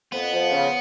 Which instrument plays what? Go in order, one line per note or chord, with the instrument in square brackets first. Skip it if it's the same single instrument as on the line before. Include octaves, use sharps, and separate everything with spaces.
[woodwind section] F2 [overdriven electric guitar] B3
[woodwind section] F3
C#3